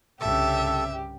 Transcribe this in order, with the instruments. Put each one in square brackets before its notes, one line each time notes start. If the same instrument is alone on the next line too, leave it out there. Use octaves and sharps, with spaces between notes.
[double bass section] C2 G2 C#3 [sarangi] G4 [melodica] A4 [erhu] E5